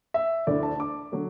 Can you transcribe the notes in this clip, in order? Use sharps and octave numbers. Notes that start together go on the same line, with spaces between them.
E5
D2 D3 A3 E4 D5
A5
D6
D3 F#3 A3